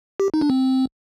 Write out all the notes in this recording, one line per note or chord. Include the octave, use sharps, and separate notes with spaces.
G4
D#4
D4
C4